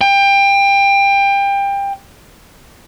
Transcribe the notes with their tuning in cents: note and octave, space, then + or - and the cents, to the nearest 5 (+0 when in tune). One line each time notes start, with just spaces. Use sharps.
G5 +25